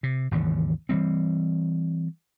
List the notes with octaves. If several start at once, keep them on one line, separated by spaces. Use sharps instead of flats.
C3
G#1 D#2 C#3 E3
E3 F3 G3 C4